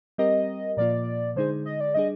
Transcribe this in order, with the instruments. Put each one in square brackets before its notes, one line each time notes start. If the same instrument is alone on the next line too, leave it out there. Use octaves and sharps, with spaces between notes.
[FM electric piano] G3 C4 G4 A#4 [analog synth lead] D#5
[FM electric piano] A#2 F3 A#3 F4 [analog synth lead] D5
[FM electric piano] D3 G#3 D#4 G#4 [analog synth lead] C5
[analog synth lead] D#5
D5
[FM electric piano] G3 D4 G#4 [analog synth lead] D#5